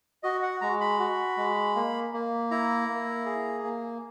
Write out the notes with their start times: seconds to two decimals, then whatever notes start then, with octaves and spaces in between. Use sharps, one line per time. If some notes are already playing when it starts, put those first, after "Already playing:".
0.23 F#4 D#5
0.43 F#5
0.61 G#3 A#5
0.81 B5
0.99 F#4
1.37 G#3
1.75 A#3
2.13 A#3
2.51 E4 A#5
2.89 A#3
3.26 G#4
3.64 A#3